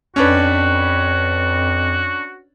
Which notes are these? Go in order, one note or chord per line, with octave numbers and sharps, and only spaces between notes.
F2 C#4 D4 F#4 B4